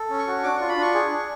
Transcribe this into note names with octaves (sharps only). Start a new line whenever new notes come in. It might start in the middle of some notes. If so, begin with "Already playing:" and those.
Already playing: A4
C#4
C#6
F#4
D4 D6
F4 C#6
B5
D4 C#6
G#4
D4